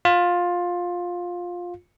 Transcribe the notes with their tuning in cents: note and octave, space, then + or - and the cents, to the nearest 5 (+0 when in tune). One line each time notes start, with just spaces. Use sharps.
F4 +15